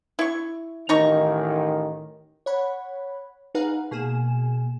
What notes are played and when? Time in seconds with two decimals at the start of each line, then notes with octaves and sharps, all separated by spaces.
0.19 E4 C#6
0.89 A1 D#3 D#4 A#5 C#6
2.46 C#5 F#5 B5
3.55 D#4 G#4 B4 F5 F#5 A#5
3.91 B2 A#3 G#4 G#5 E7